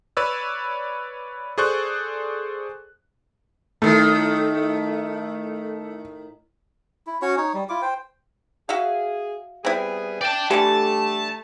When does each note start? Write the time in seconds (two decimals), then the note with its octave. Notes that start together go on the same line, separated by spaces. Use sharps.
0.17 B4 C#5 D5 E6
1.58 G#4 A4 C5 D5 C#6 F#6
3.82 A2 D#3 A3
7.07 E4
7.22 C#4 F#4 C#5 C#6
7.37 D#4 C#5
7.54 G3
7.69 E4 F4 D6
7.82 C5 G5
8.69 F#4 G#4 E5 F5
9.65 G3 B3 C4 E4 G#4
10.21 D5 G5 A5
10.51 D3 E3 G3 A3 G4 A5